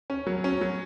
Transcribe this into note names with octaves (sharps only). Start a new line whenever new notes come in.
C#4
F#3
C#4
F#3